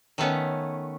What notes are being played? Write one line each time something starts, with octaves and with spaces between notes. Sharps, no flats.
D#3 A3 B3 C#4